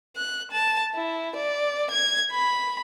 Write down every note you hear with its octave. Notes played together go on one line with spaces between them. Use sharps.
F#6
A5
E4
D5
G#6
B5